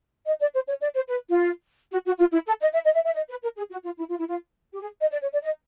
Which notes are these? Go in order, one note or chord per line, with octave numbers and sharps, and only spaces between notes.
D#5
D5
C5
C#5
D5
C5
B4
F4
F#4
F#4
F4
E4
A4
D#5
E5
D#5
E5
E5
D#5
B4
A#4
G#4
F#4
F4
E4
F4
E4
F4
G4
G#4
D#5
D5
C#5
D5
D#5